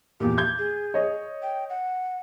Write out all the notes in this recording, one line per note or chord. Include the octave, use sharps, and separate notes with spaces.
E2 A#2 G4
G6 G#6
G#4
C#5 D#5
G5
F#5